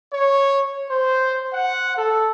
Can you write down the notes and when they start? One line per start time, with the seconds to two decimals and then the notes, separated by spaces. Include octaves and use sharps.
0.13 C#5
0.90 C5
1.53 F#5
1.97 A4